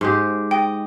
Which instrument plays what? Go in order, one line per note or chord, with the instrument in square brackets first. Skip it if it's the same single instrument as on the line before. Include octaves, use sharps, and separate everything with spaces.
[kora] G#2 G#3 G4
[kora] D#5 [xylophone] G5